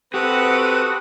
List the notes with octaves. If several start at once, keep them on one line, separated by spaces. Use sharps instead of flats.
C4 F#4 G4 A4 B4 D#6